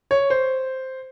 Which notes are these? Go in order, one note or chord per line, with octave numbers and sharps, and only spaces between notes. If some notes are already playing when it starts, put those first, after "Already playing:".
C#5
C5